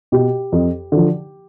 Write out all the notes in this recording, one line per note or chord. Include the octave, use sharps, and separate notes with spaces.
B2 G4
F2
D3 F3